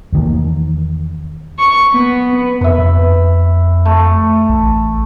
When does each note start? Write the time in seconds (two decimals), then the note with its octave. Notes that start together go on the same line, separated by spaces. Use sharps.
0.12 E2 D#3 A#3
1.59 C#6
1.94 B3
2.61 F2 B4 E5
2.78 F2
3.85 A3
4.49 A1